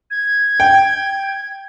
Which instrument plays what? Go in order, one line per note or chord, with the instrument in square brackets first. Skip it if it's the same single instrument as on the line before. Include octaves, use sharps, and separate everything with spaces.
[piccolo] G#6
[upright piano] G5